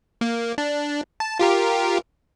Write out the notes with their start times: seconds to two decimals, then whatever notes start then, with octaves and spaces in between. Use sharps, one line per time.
0.21 A#3
0.58 D4
1.20 A5
1.39 F4 G4 A#4